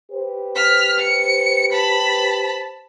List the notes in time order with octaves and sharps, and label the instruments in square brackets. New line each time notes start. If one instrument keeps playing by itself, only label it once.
[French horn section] G4 B4 C5
[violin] F6 B6
C#7
A5 B5